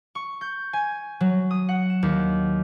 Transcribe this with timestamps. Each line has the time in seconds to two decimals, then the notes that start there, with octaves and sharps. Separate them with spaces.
0.15 C#6
0.41 G6
0.73 G#5
1.21 F#3
1.51 D#6
1.69 F#5
1.90 E7
2.03 D#2